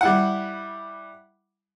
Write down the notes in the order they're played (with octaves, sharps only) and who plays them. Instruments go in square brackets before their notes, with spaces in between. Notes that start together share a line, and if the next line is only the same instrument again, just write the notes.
[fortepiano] G3 E4 F#5